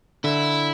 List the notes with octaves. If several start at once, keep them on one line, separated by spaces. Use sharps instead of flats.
D3 E4